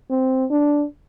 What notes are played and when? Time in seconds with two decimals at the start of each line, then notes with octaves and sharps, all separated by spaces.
0.10 C4
0.50 D4